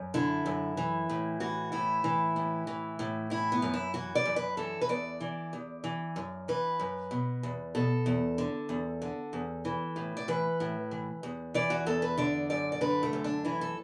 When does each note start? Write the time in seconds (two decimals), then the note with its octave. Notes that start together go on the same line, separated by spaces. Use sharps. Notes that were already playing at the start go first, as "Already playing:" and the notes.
Already playing: F#2
0.14 D3 E4
0.46 F#2
0.77 E3
1.09 A2
1.40 E3 F#4
1.72 A2 E4
2.04 E3
2.36 A2
2.67 E3
2.99 A2
3.30 E3 E4
3.52 B3
3.62 F#2
3.74 E4
3.94 E3 F#4
4.15 D5
4.26 F#2
4.36 B4
4.57 E3 A4
4.81 B4
4.89 E2 D5
5.21 E3
5.53 E2
5.84 E3
6.16 F#2
6.48 E3 B4
6.80 F#2
7.11 B2
7.43 E2
7.75 B2 A4
8.06 E2
8.38 D3
8.69 E2
9.02 D3
9.33 E2
9.65 E3
9.96 A2
10.17 D5
10.28 E3 B4
10.60 A2
10.91 E3
11.23 E2
11.54 E3 D5
11.70 F#4
11.86 E2 A4
12.02 B4
12.18 D3 D5
12.50 F#2 D5
12.72 D5
12.81 D3 B4
13.03 A3
13.13 F#2
13.24 D4
13.45 E3 E4
13.61 A4